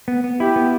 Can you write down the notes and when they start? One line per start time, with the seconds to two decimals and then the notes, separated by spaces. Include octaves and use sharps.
0.08 B3
0.24 B3
0.40 E4 G4
0.56 B3